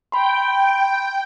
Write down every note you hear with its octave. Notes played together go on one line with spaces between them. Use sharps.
G5 B5 C6